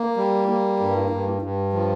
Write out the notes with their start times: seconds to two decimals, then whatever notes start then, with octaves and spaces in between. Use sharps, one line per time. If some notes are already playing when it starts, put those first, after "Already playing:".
Already playing: A#3
0.17 G3
0.48 A#3
0.80 G2
1.10 G2
1.42 G2
1.73 F3